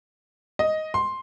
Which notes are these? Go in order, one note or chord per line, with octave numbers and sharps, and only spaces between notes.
D#5
C6